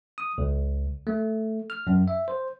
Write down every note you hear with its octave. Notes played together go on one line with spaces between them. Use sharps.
D#6
C#2
A3
F6
F#2
E5
C5